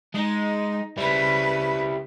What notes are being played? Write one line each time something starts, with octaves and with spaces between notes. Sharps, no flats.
G#3 D#4
C#3 G3 E4 B4